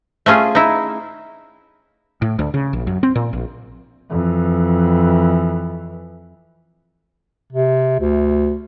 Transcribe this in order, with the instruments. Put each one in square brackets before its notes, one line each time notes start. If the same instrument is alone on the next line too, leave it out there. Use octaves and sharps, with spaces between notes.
[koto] A3 C#4 F4 G#4
D#4 E4
[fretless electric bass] A2
D2
C#3
A#1
F#2
C4
A#2
A#1
[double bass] F2 E3
[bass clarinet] C3
D2